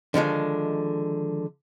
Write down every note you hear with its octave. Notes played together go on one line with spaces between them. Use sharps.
D3 D#3 F3 G#3